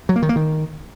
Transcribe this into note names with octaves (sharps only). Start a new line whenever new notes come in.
F#3
A#3
D#3
A#3
D#3